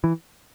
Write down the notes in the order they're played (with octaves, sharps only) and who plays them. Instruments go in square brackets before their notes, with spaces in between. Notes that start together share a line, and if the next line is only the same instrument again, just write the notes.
[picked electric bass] E3